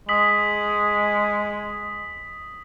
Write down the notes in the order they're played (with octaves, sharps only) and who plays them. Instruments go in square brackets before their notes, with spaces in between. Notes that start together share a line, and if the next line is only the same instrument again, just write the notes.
[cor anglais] G#3 [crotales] D#6 B6 F#7